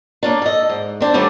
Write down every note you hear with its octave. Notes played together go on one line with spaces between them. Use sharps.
A#3 C#4 D4
A4 D#5
G#2
C4 D4 C5
D#3 G3 A3 B3 C#4 D4